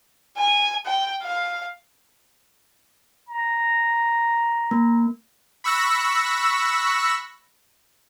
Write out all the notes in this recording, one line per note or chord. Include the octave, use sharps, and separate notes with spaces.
G#5
G5
F5
A#5
A#3
B5 C#6 E6 F#6 A#6 B6